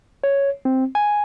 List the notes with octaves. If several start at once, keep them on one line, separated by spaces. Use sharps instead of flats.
C#5
C4
G#5